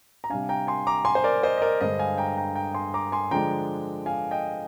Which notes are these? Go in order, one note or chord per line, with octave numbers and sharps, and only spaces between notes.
A#5
C3 G3 D4 F5 G#5
G5 A#5
G#5 C6
A#5 D6
G#5 C6
C5
A#4 D5
C5 D#5
D#5
A#4 D5
G2 D3 G#3 C5 D#5
F5 G#5
G5 A#5
G5 A#5
G5 A#5
G#5 C6
A#5 D6
G#5 C6
D3 F3 G#3 D4 G5 A#5
F5 G#5
D#5 G5